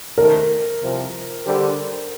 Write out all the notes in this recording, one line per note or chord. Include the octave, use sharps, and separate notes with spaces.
D#3 A3 D#4 A4 A#4 C5
C2 C3 F3
D3 G3 D4 G4 C5